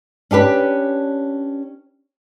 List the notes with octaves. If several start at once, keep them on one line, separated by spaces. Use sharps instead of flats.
C#4 D4 G4 B4